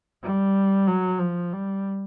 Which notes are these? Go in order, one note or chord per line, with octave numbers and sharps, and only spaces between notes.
G3
F#3
F3
G3